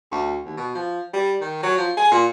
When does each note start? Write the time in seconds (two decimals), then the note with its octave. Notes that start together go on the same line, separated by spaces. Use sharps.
0.12 D2
0.46 D#2
0.57 B2
0.75 F3
1.13 G3
1.41 D#3
1.63 F#3
1.78 F3
1.97 G#4
2.12 A#2